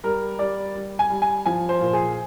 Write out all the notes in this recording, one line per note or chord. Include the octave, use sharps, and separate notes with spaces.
G3 A#4
G3 D5
G3
G#5
G3
G#5
F3 G#5
C5
A#2
G#4